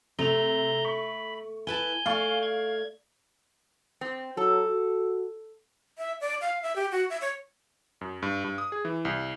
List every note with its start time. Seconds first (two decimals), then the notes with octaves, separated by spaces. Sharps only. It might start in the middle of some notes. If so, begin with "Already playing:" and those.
0.19 C3 A3 A#5 G6 F7
0.85 B5 C#6
1.67 E4 B4 G#5 A5 G6
2.06 A3 D5 F5 C#6
2.43 G#6
4.01 C4
4.37 F#3 A4
4.68 F#4
5.98 E5
6.21 D5
6.41 F5
6.62 E5
6.76 G4
6.92 F#4
7.10 E5
7.21 C#5
8.01 F#2
8.23 G2
8.44 G2
8.58 D#6
8.72 G#4
8.85 E3
9.05 C2